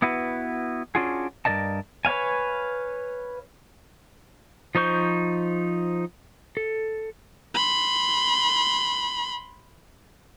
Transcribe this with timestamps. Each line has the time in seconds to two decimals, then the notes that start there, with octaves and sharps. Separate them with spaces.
0.02 B3 E4 F#4 B4
0.95 C#4 D4 F4 F#4 G#4
1.45 G2 E3 A#4 D5 D#5 A5
2.05 B4 C#5 F5 G#5
4.75 F3 D#4 C5 C#6 G6
6.57 A4
7.54 B5 C6